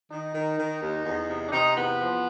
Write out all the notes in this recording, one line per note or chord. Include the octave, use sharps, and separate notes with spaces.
D#3 D#4
D#3
D#3
D#2
E2
C3
D4
C3 D#4
E2 B3
F3